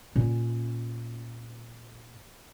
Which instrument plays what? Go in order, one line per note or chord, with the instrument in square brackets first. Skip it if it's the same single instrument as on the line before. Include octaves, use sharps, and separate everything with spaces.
[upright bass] A#2 C#4